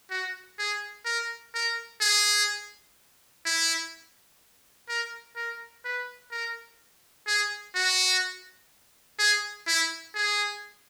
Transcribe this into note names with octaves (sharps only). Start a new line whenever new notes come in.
F#4
G#4
A#4
A#4
G#4
E4
A#4
A#4
B4
A#4
G#4
F#4
G#4
E4
G#4